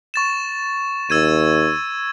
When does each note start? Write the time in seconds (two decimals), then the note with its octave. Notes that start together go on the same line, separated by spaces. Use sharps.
0.14 C#6 A6 E7
1.10 D#2 E6 G#6 D#7